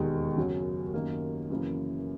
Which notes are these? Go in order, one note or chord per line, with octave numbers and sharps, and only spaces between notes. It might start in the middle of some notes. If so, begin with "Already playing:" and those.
Already playing: E1 D#2 D#3 G#3
F#2 C#3 F#3 C#4
F#2 D#3 A#3
F#2 C#3 E3 A#3 E4